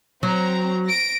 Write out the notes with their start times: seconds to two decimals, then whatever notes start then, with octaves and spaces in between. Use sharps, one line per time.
0.23 F#3 C4 A#5
0.86 A#6 D7